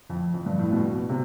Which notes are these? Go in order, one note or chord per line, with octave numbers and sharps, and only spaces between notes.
F2
F2
G2
A2
B2
B2
C3